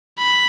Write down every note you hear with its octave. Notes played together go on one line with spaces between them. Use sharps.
B5